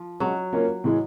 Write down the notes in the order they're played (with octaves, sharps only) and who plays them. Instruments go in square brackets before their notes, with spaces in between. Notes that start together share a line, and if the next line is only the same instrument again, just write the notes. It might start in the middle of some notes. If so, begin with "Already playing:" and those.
Already playing: [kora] F3
[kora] F#3 [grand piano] G#3 C#4 F#4
[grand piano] A#3 C#4 F4 A#4 C#5
A2 E3 G#3